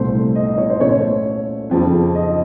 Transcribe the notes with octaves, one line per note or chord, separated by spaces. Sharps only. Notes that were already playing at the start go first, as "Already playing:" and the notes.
Already playing: C2 A#2 A3 C4 C5
D#5
D#5
C#5
C5
A#2 A3 C#4 C#5
F2 C#3 F3 C4
D#5